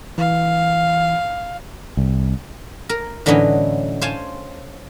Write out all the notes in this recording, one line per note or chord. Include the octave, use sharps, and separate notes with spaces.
E3 F5
C2
A#4
A2 D3 E3 F#3 C#4 D#4
C5 C#5 F5 G#5 A5